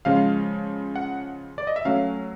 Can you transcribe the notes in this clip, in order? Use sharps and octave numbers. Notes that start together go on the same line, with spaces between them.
C#3 F3 G#3 F5
F#5
D5
D#5
E5
F#3 A3 C#4 F5